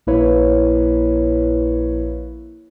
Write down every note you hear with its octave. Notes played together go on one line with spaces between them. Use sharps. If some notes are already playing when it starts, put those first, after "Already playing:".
A#1 A#3 E4 B4 C#5